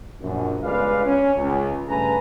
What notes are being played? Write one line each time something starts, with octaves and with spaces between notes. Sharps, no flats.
A#1 F#2
G1 C#2 G#3 B4 D5 F5
C#4
C#2
G2 C#3 A3 B4 G#5 A#5